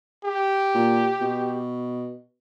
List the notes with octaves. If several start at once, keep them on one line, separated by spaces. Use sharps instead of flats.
G4
A#2
B2